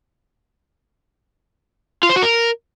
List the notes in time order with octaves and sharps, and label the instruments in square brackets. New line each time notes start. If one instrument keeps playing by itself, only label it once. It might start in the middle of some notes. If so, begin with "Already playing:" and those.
[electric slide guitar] F4
C5
F#4
A#4